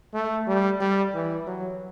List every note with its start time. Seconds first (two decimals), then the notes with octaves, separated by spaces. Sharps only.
0.14 A3
0.47 G3
0.80 G3
1.14 E3
1.47 F#3